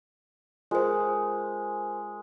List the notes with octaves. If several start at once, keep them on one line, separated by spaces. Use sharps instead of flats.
G#3 F4 A#4 C5